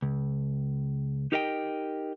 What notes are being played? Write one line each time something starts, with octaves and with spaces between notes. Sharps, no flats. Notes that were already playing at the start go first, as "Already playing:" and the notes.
C#2
D#4 G4 A#4 D#5 F5 G5